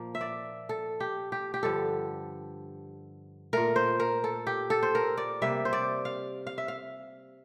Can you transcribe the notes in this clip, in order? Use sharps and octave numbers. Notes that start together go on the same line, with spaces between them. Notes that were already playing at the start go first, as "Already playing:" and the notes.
Already playing: A#2 F3 A#3
E5
D5
A4
G4
G4
G4
G2 D3 F3 A4
A#2 A3 A#4
C5
A#4
A4
G4
A4
C5
A#4
D5
C3 G3 A#3 E5
C5
D5
F5
F5
E5
F5